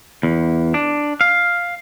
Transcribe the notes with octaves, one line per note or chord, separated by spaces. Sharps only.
E2
D4
F5